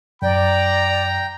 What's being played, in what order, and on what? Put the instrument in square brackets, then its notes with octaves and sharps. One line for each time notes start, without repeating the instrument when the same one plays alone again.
[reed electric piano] F#2 [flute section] D5 [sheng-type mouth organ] G5 [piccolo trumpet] A#5